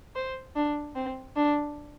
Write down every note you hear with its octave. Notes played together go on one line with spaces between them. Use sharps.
C5
D4
C4
D4